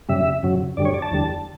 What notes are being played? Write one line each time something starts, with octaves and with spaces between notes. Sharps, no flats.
F#2 C#3 G3 E5
F#2 C#3 F#3
F#2 D3 G3 D5
C#5
D5
A5
E2 D3 G3